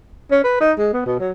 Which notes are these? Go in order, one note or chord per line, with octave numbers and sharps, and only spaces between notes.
C#4
B4
D#4
G#3
B3
B2
F#3